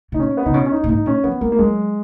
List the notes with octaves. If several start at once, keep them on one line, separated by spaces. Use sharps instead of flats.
B2 D#4
A#2 C#4
B3
C#3 D#4
B2 C#4
C#4
D#4
A#2
G#2 D#4
A#2 C#4
F3 B3
G#3 A#3
A#3
F#3 G#3